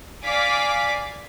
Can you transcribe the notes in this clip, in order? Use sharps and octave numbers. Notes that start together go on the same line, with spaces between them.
D5 F5 G#5 D6 B6